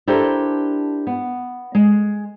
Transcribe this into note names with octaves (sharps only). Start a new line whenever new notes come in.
D4 E4 G4 A4 A#4 C5
B3
G#3